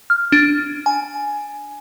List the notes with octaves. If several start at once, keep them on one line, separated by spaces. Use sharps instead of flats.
F6
D4
G#5